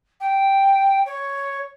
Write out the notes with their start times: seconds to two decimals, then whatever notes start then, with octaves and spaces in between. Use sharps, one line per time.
0.20 G5
1.05 C#5